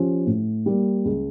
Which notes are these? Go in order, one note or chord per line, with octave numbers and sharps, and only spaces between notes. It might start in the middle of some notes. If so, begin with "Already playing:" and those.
Already playing: F3 C#4 G4
A2
G3 A#3
C#2